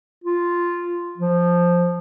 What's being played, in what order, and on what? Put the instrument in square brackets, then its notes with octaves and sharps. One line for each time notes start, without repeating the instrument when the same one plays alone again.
[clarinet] F4
F3